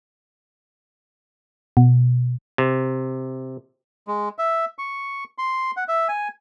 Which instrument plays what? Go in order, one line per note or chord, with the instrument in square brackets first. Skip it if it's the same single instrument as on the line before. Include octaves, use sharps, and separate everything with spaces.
[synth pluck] B2
[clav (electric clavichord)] C3
[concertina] G#3
E5
C#6
C6
F#5
E5
G#5